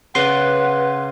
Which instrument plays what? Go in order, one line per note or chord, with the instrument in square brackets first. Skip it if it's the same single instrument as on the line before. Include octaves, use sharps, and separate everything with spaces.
[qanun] C#3 D5 [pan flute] B4 [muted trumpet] F#5 [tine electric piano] C6